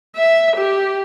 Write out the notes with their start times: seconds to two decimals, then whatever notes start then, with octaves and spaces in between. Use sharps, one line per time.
0.16 E5
0.57 G4